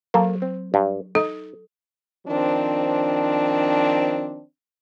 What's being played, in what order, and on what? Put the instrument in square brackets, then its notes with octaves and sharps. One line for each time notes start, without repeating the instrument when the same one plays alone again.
[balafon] F#3 [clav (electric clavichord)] A#3 A4
[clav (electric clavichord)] C4
G2
[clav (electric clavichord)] D#4 [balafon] A4
[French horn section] D#3 F3 C4 D4